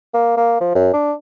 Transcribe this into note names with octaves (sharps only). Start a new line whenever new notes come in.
A#3
A#3
F3
F#2
D4